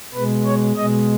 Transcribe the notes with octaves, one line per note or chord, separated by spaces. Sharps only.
B2 G#3 B4
C#5
B2 G#3 D#5